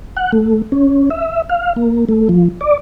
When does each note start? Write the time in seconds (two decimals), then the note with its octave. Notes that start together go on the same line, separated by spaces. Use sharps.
0.17 F#5
0.32 A3
0.72 C#4
1.10 E5
1.50 F5
1.76 A#3
2.09 A3
2.29 F3
2.61 D5